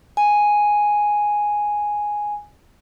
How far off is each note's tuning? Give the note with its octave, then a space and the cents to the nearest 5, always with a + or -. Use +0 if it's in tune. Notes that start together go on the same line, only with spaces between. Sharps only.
G#5 +0